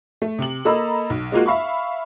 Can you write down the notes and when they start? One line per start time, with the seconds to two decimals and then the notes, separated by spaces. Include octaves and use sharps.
0.22 A3
0.39 C3 F#7
0.65 A#3 A4 D#5 A#5 B5 E6
1.10 B1
1.32 G#3 A#3 F4 F#4
1.46 E5 F5 B5 C#6